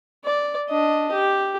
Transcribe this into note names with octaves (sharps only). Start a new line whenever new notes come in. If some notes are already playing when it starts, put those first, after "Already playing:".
D5
D4 D#5
G4